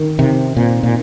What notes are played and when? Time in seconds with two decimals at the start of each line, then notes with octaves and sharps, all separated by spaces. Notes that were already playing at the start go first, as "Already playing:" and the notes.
Already playing: D#3
0.19 C3 D#3
0.57 A#2 C4
0.83 A#2